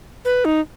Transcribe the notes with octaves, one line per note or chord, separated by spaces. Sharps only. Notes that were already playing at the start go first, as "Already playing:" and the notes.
B4
D#4